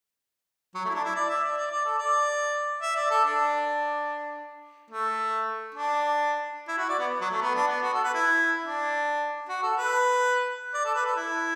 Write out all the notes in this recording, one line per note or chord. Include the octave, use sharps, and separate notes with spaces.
F#3
A3
E4
D4
E4
D5
E5
D5
D5
D5
A4
D5
E5
D5
A4
D4
A3
D4
E4
F#4
D5
B3
F#3
A3
B3
D4
B3
F#4
A4
B4
E4
D4
F#4
A4
B4
D5
A4
B4
A4
E4